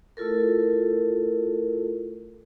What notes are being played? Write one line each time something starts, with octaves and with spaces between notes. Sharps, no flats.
A3 E4 F4 A4 A#4